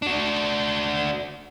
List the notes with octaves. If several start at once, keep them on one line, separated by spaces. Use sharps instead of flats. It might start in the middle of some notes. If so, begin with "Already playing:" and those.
D4 F#4